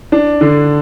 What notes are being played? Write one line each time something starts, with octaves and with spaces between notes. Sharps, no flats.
D4
D3